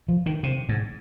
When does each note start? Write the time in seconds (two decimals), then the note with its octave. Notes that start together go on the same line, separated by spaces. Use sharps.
0.08 F3
0.26 D#3
0.43 C3
0.69 G#2